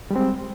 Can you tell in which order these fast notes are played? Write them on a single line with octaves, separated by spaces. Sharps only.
G3 G#3 C4